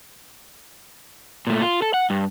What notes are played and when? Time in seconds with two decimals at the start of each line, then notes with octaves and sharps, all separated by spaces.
1.47 A#2 A3
1.62 F4
1.82 A4
1.94 F#5
2.10 G2